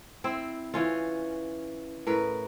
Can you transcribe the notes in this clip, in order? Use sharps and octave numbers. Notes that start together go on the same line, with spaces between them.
C4 E4
E3 C#4 F4
A2 A#4 B4